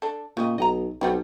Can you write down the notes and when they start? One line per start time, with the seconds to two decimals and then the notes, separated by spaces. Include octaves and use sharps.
0.02 D4 A4
0.37 A#2 C#3 G4 D#5
0.58 B1 D#5 F#5 A#5
1.01 B1 G3 B3 C4